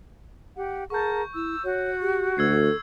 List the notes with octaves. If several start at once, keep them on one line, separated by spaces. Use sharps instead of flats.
G4 F#5
G#4 A#4 F#5 A5 C#6 G6
E4 E6
F#4 C#5
G4
D2 A4 E6 G#6 C7